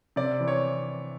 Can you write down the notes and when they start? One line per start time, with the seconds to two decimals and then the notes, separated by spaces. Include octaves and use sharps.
0.16 C3 D5
0.40 E3
0.48 C#5